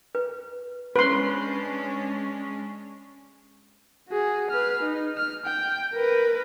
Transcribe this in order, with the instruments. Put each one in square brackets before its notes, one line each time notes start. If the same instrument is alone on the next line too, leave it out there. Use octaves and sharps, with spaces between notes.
[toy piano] B4
[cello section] G#3 C#4 D4 [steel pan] B4 C6
[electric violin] F#4 G#4
B4 F6
D#4
F6
G5
A#4 B4